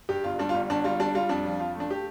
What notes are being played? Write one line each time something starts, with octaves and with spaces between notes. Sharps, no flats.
G2 G4
G1 F4
G3 D4
F4
G1
G1 D4
G3 F4
G3 D4
G3 F4
F2 D4
F3
F2 F4
A3
D4
G4